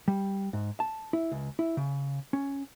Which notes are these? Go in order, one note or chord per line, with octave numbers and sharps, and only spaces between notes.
G3
G#2
A5
E4
C#2
E4
C#3
C#4